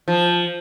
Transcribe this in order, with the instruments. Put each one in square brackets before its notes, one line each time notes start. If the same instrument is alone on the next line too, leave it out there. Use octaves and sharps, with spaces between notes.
[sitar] F3